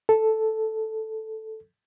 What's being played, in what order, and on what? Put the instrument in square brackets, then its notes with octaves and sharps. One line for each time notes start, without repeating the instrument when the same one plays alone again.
[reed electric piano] A4